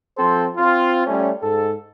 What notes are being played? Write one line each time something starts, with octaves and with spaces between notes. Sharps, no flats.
F3 C4 A4 C5
C4 F4
G3 A3 C#4
G#2 A4